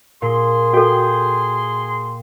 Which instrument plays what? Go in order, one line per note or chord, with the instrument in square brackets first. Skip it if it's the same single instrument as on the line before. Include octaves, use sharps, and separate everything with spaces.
[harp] A#2 [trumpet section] G#4 C6
[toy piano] F#4 A4 [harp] G5